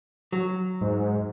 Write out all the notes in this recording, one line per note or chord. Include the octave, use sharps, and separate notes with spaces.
F#3
G#2